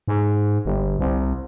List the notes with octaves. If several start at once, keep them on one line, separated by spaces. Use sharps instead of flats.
G#2
G1
C2